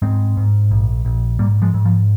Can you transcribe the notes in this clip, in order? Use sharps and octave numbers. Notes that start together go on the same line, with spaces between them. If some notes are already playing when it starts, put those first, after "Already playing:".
G#2 G#3 C4
G#2
A#1
A#1
G#2 G3 A#3
F3 G#3
G#2
F3